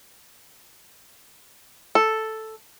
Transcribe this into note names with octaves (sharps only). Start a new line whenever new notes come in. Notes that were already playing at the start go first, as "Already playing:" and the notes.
A4